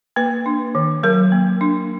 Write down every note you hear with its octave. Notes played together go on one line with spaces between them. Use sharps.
A#3 B4
D4
D#3
F#3 A#4
A#3
D4